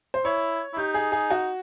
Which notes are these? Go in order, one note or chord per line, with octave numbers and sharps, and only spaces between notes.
C5
E4 C#5
E4
D#4 G4
G#4
G#4
F#4